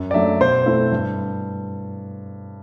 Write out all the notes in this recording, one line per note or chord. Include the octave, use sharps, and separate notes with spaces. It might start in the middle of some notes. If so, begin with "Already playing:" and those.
Already playing: F#2
D5
F#3 A3 D4 E5
B2 C5
A3 C4 E4
G2